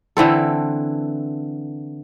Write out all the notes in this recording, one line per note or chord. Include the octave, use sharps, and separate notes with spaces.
D3 E3 C4 A4